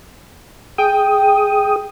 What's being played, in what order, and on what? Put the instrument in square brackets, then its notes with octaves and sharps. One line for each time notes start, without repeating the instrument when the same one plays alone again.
[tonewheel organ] G#4 D#6 [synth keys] G5